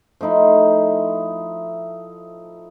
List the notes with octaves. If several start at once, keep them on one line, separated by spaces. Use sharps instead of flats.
F3 A3 D#4 E4